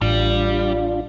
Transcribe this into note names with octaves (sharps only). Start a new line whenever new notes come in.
A1 G3 D4 F4